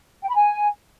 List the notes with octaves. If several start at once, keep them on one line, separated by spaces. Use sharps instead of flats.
G5
B5
G#5